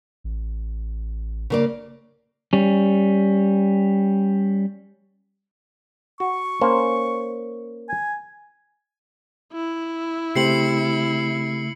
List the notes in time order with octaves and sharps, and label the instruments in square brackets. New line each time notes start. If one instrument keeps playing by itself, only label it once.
[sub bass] A1
[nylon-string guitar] C#3 A#3 D5
[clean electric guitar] G3 C#4
[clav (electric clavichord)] F#4 [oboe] C#6
[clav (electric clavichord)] A#3 C#4 C5
[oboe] G#5
[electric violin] E4
[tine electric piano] C#3 A3 [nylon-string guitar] C4 G4 C5 [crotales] C7 C#7 F#7